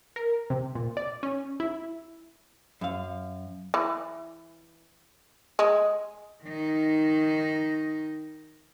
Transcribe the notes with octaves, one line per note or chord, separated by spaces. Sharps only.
A#4
C3
A#2
D5
C#4
E4
F#2 F5
E3
G#3
D#3 D#4